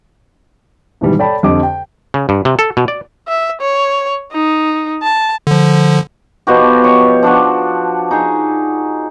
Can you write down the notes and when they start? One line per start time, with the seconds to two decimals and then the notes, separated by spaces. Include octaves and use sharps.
1.01 G#2 B2 D#3 E3 G3
1.19 A4 C#5 D5 G5 A5 B5
1.43 F2 D3 G4 D#5 D6
1.63 G5
2.14 C#3
2.29 G2
2.45 C3
2.59 A4
2.77 B2
2.88 D5
3.28 E5
3.61 C#5
4.32 D#4
5.03 A5
5.47 D3 F3
6.47 B2 F3 F#4 G4
6.84 C#5 G5
7.23 F3 D4 F4 F#4
8.11 D#4 G#4